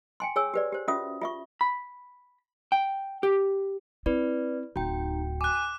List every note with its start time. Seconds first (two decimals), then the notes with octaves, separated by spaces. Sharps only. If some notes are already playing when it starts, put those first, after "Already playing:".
0.20 G5 G#5 C6
0.36 G#4 C#5 G#5 E6
0.54 G4 B4 D5
0.72 G4 C5
0.88 C#4 F4 F#4 E5 D#6
1.21 F4 E5 C#6
1.61 B5
2.72 G5
3.23 G4
4.06 C4 E4 B4 D5
4.76 D1 D#4 F#4 G5
5.41 G#5 D6 F#6